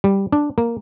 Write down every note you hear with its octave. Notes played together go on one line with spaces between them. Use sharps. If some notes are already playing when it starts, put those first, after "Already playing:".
G3
D4
A#3